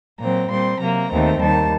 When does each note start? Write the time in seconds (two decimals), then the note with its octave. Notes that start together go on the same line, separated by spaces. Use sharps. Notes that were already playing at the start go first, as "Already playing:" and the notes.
0.19 A#2 F#3 C4 A#5
0.50 A#2 G3 C4 C6
0.81 C3 F#3 A#3 A#5
1.11 D#2 D#3 A3 C4
1.41 D#2 D#3 G3 A5